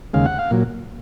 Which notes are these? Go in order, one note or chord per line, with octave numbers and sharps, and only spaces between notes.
D#2 C#3 G#3 F5
F#5
F5
A#2 F#3